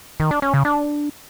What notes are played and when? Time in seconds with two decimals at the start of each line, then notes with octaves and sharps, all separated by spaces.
0.20 D#3
0.31 D4
0.42 C#4
0.54 C#3
0.65 D4